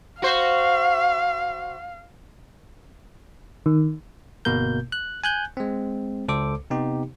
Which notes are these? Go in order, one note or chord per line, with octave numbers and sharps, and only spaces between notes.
F#4 C5 F5
D#3
G1 B2 A#3 A#4 G6
F#6
G#5 F#6 G6
G#3 C4
C#2 A4 C5 D6
C3 B3 D#4 G4